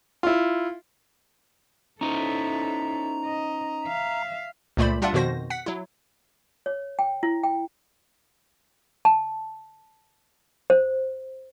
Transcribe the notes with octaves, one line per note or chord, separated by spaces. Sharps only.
E4 F4
C#4 D#4 E4 A4 C5 A#5
D#5
E5 F5
C#2 A#2 A3 C5 D5 B5
G3 D4 F4 D5 E5 F#5
F2 B2 D#3 F#4 C5 A#6
F#5 B6
F#3 E4
C#5
G5
E4
G5
A5
C5